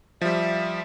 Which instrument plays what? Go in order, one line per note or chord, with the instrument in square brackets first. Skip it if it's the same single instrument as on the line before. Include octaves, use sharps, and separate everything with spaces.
[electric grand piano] F3 G3 [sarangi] E5